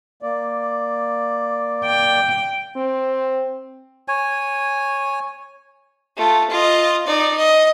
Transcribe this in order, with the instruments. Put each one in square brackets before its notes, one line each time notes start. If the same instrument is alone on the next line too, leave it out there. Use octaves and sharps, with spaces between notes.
[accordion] A#3 D5
[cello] G5
[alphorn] C4
[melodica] C#5 G#5
[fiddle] A3 F4
F4 D#5
D#4 D5
D#5